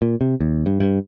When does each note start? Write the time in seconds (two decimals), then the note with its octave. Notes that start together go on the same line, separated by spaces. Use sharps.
0.02 A#2
0.21 C3
0.41 D#2
0.66 G2
0.80 G2